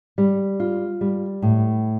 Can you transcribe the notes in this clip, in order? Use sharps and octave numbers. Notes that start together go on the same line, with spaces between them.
G3
F4
G3
A2